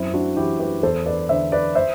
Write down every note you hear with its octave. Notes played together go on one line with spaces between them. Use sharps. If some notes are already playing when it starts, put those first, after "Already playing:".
Already playing: F#2 C4 E4
D4 F#4
E3 E4 G4
G4 B4
E2 A4 C5
B4 D5
D3 C5 E5
B4 D5
C5 E5